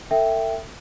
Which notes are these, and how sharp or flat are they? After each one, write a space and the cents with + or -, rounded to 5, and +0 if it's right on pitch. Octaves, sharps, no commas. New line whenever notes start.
A4 +40 E5 +0 G5 +0